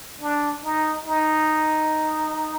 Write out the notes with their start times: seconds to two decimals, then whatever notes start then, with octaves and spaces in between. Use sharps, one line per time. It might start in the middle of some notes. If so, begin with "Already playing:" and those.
0.21 D4
0.63 D#4
1.06 D#4